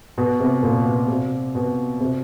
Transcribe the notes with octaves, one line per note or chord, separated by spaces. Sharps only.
B2
C3
A#2
B2
C3
B2
C3